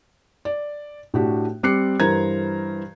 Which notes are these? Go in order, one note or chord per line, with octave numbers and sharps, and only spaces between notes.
D5
A2 D4 F#4 G4
G3 C4 D6 F#6 C7 C#7
G2 E3 A#4 C5 A#5 G#6